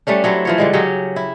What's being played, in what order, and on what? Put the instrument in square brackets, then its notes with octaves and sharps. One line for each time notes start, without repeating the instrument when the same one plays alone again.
[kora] G3 A3 C#4 D4
F#3 A3 C4 E4
E3 F3 C#5
D3 G3 G#3
C#3 F#3 C#4 G4
E4